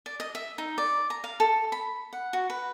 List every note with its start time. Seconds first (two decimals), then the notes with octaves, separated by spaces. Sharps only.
0.06 D5
0.20 D#5
0.35 E5
0.58 D#4
0.78 D5
1.10 A#5
1.24 F5
1.40 A4
1.72 B5
2.13 F#5
2.33 F#4
2.50 B4